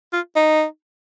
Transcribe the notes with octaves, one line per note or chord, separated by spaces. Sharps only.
F4
D#4